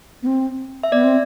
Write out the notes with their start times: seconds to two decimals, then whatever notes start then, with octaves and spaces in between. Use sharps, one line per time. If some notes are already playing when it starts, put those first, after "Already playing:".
0.23 B3
0.26 C4
0.83 E5
0.92 B3 D5
1.04 C4